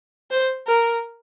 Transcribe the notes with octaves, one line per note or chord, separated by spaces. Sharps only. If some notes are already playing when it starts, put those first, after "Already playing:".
C5
A#4